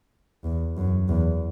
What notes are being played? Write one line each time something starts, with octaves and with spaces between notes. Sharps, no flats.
E2
F#2
E2